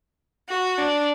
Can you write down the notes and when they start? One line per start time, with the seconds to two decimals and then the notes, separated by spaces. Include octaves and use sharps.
0.49 F#4
0.78 D4